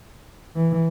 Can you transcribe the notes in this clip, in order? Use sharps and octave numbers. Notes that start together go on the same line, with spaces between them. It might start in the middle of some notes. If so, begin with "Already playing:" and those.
E3